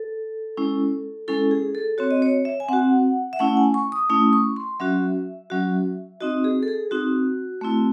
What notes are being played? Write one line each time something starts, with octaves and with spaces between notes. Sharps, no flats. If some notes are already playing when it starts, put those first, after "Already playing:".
Already playing: A4
G#3 C#4 E4
G#3 C#4 E4 A4
G#4
A4
C4 F#4 C#5
D#5
C#5
E5
G#5
C4 F#4 F#5
E5
A3 C#4 E4 F#5
G#5
C#6
D#6
A3 C#4 E4 D#6
C#6
C6
F#3 C#4 F#4 E5
F#3 C#4 F#4
C4 D#4 F#4 D#5
G#4
A4
G#4
C4 D#4 F#4
A3 C4 E4